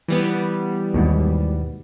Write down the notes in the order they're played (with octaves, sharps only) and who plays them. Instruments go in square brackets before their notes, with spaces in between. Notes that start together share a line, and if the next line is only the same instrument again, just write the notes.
[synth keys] E3 G3 B3
[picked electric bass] D#2 G#2 B2